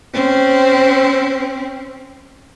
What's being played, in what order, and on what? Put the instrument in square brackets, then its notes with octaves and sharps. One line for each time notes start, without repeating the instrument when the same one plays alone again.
[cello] C4 C#4